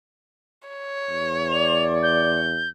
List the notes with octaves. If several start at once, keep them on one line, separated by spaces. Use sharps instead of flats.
C#5
E2
D5 F7
G6